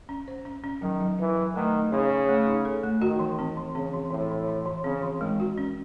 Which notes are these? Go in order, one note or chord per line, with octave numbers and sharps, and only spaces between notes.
C#4
C5
C#4
C#4
D#3 F#3
F#3
E3 F#3
F#3
D#3 A3
A3
C#3 D#4
G#4
A3
D#4
A4
A3
D#3 F#4
E3
C4
E3
C#3 C4
E3
A2 E3
E3
E3
E3
C#3 C4
E3
D#3 G#3
F#4
C#4